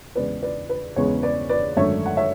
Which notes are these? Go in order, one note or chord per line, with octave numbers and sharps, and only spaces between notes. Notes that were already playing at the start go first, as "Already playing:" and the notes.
E2 C#3 G#3 B3 B4 D5
B4 D5
B4
E2 C#3 G#3 B3 C#5
B4 D5
B4 D5
G#1 F#2 D3 A3 C#5 E5
F#5
C#5 E5